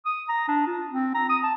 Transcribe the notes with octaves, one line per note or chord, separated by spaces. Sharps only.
D#6
A#5
D4
F4
C4
A#5
D#6
A5